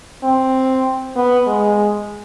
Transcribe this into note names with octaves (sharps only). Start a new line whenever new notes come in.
C4
B3
G#3